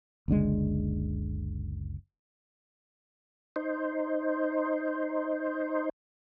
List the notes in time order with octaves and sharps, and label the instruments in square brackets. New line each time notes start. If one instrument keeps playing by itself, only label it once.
[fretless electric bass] F#1 C#2 D3 G#3
[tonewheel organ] D#4 C5